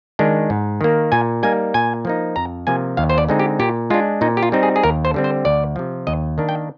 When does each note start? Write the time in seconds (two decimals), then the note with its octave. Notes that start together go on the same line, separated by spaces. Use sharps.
0.19 D#3 G#3 D4
0.50 G#2
0.81 D#3 A#3
1.12 A#2 G#5
1.43 G3 A#3 D#4 G#5
1.74 A#2 G#5
2.05 F3 A#3 D#4
2.36 F2 A#5
2.67 C3 F3 A#3 G#5
2.97 D#2 F5
3.09 C5
3.18 D5
3.29 D3 G#3 C4 D#4
3.39 G4
3.59 A#2 G4
3.90 G#3 D4 F4
4.21 A#2 D#4
4.37 G4
4.43 F4
4.52 G3 C4 D#4
4.63 G#4
4.76 G#4
4.83 D#2 A#4
5.05 C5
5.14 D3 G3 C4
5.24 C5
5.45 D2 D5
5.76 C3 F3
6.07 D#2 D#5
6.38 D#3 A#3 D4
6.49 G5